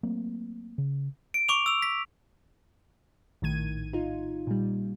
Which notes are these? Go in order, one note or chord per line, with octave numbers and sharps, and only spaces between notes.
F#3 A3 A#3 C4
C#3
D7
C#6 D6 F7
E6 F7
B6
A#1 A2 D#3 G#6 D#7
D#4 F4
A#2 G3